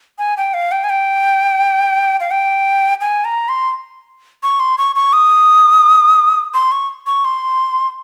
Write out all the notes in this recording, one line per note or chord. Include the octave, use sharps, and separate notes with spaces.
G#5
G5
F5
G5
G#5
G5
F5
G5
G#5
A#5
C6
C#6
C6
C#6
C#6
D#6
C6
C#6
C#6
C6